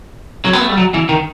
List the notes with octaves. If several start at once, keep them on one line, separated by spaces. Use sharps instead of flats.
F#3
B3
A3
G3
F#3
E3
D#3